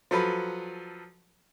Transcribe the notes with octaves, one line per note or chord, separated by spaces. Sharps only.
F3 F#3 A4 B4